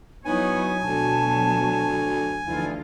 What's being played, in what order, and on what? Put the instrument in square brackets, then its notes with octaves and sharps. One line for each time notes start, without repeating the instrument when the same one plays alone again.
[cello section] F#3 E4 C#5 [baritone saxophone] B3 [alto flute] D#4 [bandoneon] G#5
[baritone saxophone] D2 [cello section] B2 F#3 [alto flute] A5
[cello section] D2 F3 F4 [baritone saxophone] E3 [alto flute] D#4